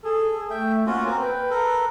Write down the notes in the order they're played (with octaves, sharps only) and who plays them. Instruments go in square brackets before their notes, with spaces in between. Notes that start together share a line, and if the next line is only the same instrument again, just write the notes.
[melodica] G#4 [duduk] A4
[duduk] A3 [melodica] E5 G5
[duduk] A#3 [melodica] C#4 F4 F#4
[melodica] C4 A#4
[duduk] B4 [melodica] G5
[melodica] A4 A#4